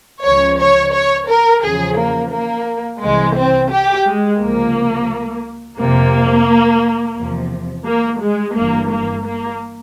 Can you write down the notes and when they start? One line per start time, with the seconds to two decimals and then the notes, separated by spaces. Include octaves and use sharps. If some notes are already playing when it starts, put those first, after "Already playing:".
0.25 C#2 C#3 F3 C#5
0.60 C#5
0.94 C#5
1.29 A#4
1.63 E2 C#3 F3 G#4
1.99 A#3
2.32 A#3
3.02 C2 C3 E3 G#3
3.36 C4
3.72 G4
4.06 G#3
4.41 C#2 C3 F3 A#3
5.79 F2 C3 F3 A#3
7.18 E2 C3 F3
7.86 A#3
8.22 G#3
8.56 G1 G2 E3 A#3
8.91 A#3
9.25 A#3